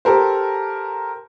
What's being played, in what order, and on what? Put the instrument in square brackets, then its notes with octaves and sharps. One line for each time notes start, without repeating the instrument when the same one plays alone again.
[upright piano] G4 A4 A#4 C5